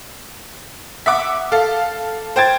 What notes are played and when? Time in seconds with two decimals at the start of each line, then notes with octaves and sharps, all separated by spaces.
1.06 E5 F#5 D6
1.52 A4 F5
2.36 C5 G5 G#6 A6